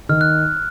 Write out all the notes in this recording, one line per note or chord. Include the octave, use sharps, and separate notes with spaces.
D#3 F6
F#6